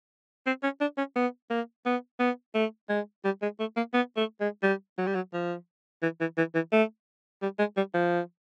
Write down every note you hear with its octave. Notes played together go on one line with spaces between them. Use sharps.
C4
C#4
D4
C#4
B3
A#3
B3
B3
A3
G#3
G3
G#3
A3
A#3
B3
A3
G#3
G3
F#3
G3
F#3
F3
E3
E3
E3
E3
A3
G3
G#3
G3
F3